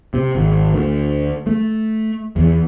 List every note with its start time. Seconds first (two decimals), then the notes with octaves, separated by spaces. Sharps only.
0.14 C3
0.35 G#1
0.74 D2
1.47 A3
2.36 E2